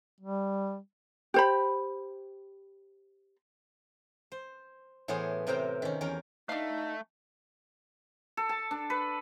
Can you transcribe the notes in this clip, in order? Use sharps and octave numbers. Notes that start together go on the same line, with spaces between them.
G3
G4 C5 B5
C5
A2 E3 B3 G#4 C5 C#5
A2 C3 A#4 C5 G5 A#5
D#3 C#4
E2 C#4 A#4 G5
A3 D4 D#4 D#5 F5
A4
A5
D4
B4